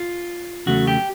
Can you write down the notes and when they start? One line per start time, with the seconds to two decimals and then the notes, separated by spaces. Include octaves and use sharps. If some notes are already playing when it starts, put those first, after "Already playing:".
Already playing: F4
0.66 E2 C#3 F#3 A3 F#4
0.87 G4